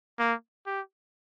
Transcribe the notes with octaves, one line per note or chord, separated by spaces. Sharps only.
A#3
G4